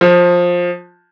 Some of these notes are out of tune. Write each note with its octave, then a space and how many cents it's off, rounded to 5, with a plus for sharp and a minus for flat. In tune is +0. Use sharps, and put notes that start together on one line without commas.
F3 +15